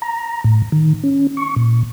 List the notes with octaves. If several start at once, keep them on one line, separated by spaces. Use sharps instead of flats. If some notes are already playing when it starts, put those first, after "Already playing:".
A#5
A2
D#3
C#4
C#6
A#2